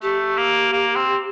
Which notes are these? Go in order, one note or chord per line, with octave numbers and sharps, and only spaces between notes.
A3 G4
A#3
A#3
C4